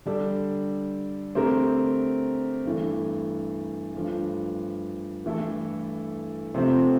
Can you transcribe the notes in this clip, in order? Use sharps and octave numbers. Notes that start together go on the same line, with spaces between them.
D3 G3 D4 A4
D3 A3 C4 G4 A#4
G2 E3 A3
G2 F3 A3
G2 E3 A3 E4 A4
C3 F3 A3 C4